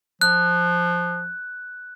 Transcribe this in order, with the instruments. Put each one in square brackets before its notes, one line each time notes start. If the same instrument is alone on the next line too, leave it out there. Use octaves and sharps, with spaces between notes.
[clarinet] F3 [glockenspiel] F#6